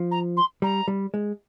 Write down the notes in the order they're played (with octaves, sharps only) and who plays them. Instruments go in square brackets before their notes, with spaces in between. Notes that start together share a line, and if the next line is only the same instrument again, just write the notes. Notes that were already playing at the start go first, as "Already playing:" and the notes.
Already playing: [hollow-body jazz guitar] F3
[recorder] A#5
C6
[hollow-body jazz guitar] G3 [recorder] A#5
[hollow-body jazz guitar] G3
G#3